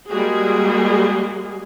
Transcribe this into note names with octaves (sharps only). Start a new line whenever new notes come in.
G3 G#3 A#3 F#4 G#4